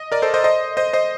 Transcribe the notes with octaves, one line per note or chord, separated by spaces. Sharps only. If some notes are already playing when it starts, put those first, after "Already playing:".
Already playing: D#5
A#4 D5
A4 C5
C5 D#5
C5 D#5
C5 D#5
C5 D#5